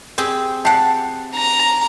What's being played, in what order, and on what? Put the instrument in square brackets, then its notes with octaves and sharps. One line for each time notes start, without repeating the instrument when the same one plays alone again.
[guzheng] C4 G4 G#4
[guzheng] G4 F#5 [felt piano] A5 C7
[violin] A#5